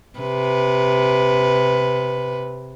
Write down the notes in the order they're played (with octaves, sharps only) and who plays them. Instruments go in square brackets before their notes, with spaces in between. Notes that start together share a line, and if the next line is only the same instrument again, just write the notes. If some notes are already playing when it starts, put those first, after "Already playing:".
[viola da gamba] C3 B4